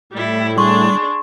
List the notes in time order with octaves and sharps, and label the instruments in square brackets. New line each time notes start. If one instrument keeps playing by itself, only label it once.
[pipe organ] A2 [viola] G3 E4
[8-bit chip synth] G3 [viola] D4 G#4 [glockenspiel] C6 C#6